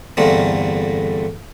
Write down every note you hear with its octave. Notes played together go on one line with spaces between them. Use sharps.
E2 G2 D3 A3 A#3 C4